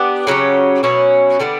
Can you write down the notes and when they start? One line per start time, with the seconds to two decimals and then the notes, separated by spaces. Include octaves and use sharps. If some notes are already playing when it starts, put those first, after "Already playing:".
Already playing: B3 D4 G4
0.27 C#3 F#3 C#4 G4
0.83 B2 F#3 C#4 E4
1.39 D3 G3 B3 D4